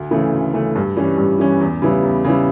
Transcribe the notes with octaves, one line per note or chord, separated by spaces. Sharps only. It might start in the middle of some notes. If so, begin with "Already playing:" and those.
Already playing: D2
C#3 E3 A3
D2
C#3 E3 A3
G2
E3 G3 C#4
G2
E3 G3 C#4
E2
C#3 G3 B3 E4
E2
C#3 G3 B3 E4